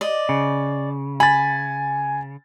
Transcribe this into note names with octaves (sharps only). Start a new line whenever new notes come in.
D5 D#5
C#3
G#5 B5 A6